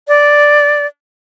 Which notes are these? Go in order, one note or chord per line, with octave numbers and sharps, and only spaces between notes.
D5